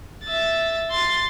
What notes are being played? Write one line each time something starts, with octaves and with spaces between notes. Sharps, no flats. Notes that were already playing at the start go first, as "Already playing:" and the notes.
E5 A6
C6 A6